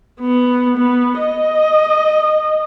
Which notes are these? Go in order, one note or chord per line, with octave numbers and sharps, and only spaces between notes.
B3
B3
D#5